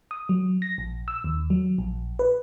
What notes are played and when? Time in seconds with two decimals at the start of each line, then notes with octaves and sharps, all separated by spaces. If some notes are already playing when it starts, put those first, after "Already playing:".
0.11 D#6
0.29 F#3
0.62 A#6
0.78 A#1
1.08 E6
1.24 D#2
1.50 F#3
1.78 A#1
2.19 B4